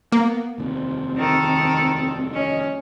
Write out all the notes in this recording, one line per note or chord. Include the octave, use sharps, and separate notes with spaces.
A#3 B3
F1 D#2 C4
D#3 A4
C#4 D#5